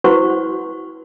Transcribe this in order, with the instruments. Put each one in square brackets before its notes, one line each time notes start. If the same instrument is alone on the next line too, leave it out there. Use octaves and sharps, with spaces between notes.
[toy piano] E4 F#4 B4 C5 F#5 C#6